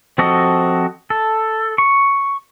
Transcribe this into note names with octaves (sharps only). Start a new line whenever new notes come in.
F3 C4 F#4 A4 D#5
A4
C#6